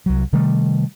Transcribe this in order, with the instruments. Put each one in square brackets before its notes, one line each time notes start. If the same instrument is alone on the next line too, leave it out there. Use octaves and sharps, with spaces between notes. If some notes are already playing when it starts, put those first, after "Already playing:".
[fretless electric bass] C2 F#3
C3 D#3 G3 A3